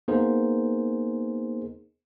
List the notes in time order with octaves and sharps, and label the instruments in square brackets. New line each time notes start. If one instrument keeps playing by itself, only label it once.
[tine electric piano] A#3 B3 D#4 G#4 A#4 C5